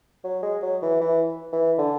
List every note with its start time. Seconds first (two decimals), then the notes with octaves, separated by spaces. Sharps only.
0.24 F#3
0.42 G#3
0.63 F#3
0.82 E3
1.01 E3
1.52 E3
1.78 D3